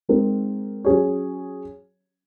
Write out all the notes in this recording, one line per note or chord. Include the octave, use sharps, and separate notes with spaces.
G#3 C4 D#4 A#4
F#3 C#4 G#4 C#5